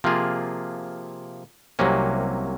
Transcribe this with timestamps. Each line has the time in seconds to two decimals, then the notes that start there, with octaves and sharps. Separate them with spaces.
0.04 C3 F3 A#3 F4 G#4
1.79 C2 C3 F#3 A#3 C#4